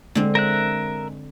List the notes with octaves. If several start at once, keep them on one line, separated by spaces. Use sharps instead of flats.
D3 G#3 C4
A#4 E5 F#6